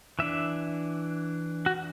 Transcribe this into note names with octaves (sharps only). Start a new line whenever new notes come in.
E3 D4 E5
F#4